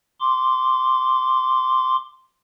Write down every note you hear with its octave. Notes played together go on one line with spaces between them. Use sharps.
C6 D6